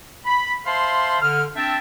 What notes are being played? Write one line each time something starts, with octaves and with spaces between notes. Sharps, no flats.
B5
C5 E5 F5 A5 B5 C6
D3 F6
C4 D4 E5 G5 A5